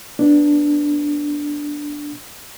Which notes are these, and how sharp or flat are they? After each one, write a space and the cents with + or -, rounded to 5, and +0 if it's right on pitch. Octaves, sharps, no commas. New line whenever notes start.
B3 +0 D4 +0